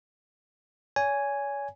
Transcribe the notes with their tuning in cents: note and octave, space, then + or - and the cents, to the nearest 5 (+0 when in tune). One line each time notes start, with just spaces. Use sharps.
C#5 +35 G#5 +0